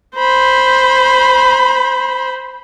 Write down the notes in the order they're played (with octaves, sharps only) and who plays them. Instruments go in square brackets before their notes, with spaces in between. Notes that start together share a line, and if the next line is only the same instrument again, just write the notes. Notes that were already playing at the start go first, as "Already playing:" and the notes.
[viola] C5 B5